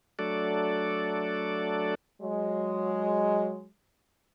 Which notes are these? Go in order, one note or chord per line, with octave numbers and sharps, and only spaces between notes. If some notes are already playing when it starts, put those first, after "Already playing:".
F#3 A3 D4 A4 D5
F#3 G#3